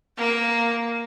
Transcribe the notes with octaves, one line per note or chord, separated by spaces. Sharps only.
A#3